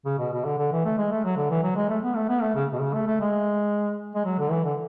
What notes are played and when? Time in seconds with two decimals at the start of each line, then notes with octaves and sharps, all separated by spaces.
0.06 C#3
0.19 B2
0.33 B2
0.45 D3
0.58 D3
0.72 E3
0.85 A3
0.98 G#3
1.11 A3
1.25 F#3
1.37 D3
1.50 E3
1.63 F#3
1.76 G#3
1.89 A3
2.03 B3
2.16 A3
2.29 B3
2.41 A3
2.55 C#3
2.73 B2
2.81 C#3
2.94 A3
3.07 A3
3.20 G#3
4.15 G#3
4.25 F#3
4.39 D3
4.51 E3
4.64 D3